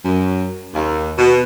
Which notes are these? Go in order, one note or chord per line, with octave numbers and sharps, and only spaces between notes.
F#2
D#2
B2